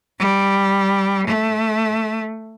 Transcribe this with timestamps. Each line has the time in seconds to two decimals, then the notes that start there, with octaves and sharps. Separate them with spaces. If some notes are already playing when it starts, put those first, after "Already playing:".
0.19 G3
1.26 A3